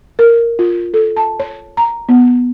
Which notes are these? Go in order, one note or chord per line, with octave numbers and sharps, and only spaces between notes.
A#4
F4
A4
A5
C#5
A#5
B3